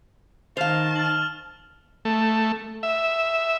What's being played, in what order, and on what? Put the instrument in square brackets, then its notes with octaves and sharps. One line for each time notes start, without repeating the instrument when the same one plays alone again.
[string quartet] D#3 A5 [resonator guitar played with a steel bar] C5 F5 [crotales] F6 F7
[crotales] F6 F#7
[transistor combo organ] A3
E5